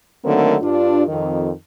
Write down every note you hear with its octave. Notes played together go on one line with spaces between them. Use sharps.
D3 D#3 F#3 A3 A#3 C4
G2 D4 F4
F2 D#3